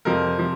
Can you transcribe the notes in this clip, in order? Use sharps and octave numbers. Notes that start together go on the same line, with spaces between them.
F2 C3 F3 A#4
C3 F3